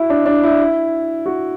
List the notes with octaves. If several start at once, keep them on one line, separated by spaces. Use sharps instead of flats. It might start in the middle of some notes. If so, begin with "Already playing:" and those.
Already playing: E4 F#4
D4
D4
E4
F#4